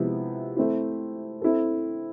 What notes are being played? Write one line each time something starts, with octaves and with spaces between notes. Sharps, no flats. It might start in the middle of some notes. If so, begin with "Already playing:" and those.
Already playing: C3 F3 G#3 B3 E4
A3 C4 E4
C4 E4 A4